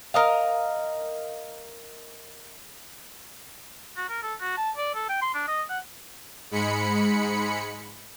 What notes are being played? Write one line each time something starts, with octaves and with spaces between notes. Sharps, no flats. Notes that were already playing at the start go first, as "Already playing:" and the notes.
A#4 D#5 F5
F#4
A#4
A4
F#4
A5
D5
A4
G5
C6
D4
D#5
F#5
G#2 G#3 B5 C#7